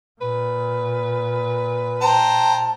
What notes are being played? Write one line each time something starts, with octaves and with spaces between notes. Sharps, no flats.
A#2 B4
C5 G5 A5 A#5